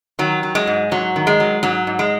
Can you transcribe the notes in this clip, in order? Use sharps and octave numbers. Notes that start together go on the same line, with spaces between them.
D#3 F#3
F#3
G#3
G#2
G#2 F#3
D#3
G#3
F#3
G#2 F#3
G#2
G#3